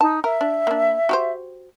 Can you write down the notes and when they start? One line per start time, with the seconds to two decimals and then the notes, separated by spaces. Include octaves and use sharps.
0.01 D#4 A5
0.24 A#4 E5
0.41 D4
0.67 A#3 D4
1.09 F#4 G4 C5